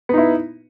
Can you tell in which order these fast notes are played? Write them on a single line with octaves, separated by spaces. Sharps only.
B3 D#4 E4